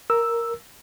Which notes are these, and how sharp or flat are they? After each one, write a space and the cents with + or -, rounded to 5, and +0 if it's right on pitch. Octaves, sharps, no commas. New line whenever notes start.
A#4 +0 E6 +0